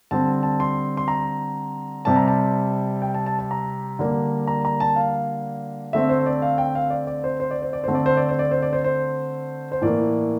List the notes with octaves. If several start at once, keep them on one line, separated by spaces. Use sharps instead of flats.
D3 G3 C4 A5
A5
C6
C6
A#5
C3 G3 C4 A5
A#5
A5
G5
A5
A5
A5
A#5
D3 G3 A#3 D4
A#5
A#5
A5
F5
D3 A3 C4 E5
C5
D5
F5
G5
F5
D5
D5
C5
C5
D5
C5
D5
D3 A3 C4 C5
D5
C5
D5
C5
D5
C5
D5
C5
C5
C5
A2 E3 A#3 D5